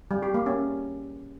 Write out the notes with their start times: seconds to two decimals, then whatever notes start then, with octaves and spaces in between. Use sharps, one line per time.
0.11 G3
0.23 G4
0.34 A#3
0.46 C#4